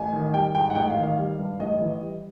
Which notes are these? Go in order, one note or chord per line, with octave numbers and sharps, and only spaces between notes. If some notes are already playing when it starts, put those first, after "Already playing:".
Already playing: A1 G#5
D#3
G3 G5
G#2 G5
F#5
A1 G5
F5
D#3
F5
G3
G2
A1 D#5
E3
G3